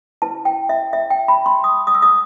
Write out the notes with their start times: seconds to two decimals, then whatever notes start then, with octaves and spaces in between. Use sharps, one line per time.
0.22 E4 B4 A5
0.45 G5
0.69 E5
0.93 E5
1.10 G5
1.28 B5
1.46 C6
1.64 D#6
1.87 D#6
1.95 E6
2.02 D#6